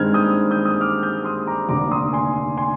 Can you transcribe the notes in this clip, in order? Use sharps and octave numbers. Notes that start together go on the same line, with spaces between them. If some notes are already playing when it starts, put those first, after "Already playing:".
Already playing: G2 D#3 G#3 C4 D#4 F6 G#6
D#6 G6
D#6 G6
D#6 G6
D6 F6
D#6 G6
C6 D#6
A#5 D6
F1 D#2 D3 A#5 D6
C6 D#6
G#5 C6
G#5 C6